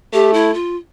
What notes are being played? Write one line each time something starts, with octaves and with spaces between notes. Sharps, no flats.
A3 G4
E4
F4